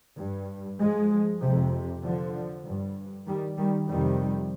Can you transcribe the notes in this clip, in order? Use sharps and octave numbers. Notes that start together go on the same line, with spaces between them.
G2
F3 G#3
F2 C3
D3 F3
G2
D#3 G3
D#3 G3
F2 C3 D#3 G3